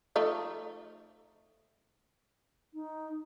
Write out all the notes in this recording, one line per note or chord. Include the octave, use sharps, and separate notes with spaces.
F3 A3 D#4
D#4